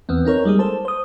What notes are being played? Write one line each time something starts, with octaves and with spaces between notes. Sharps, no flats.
E2 B3 C4
C4 D#4 A#4 C#5
G3 G#3 A#3 G#4
A4 C5 A5
C5 D#6